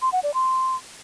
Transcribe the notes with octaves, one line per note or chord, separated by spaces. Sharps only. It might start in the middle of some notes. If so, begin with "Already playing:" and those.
C6
F#5
D5
C6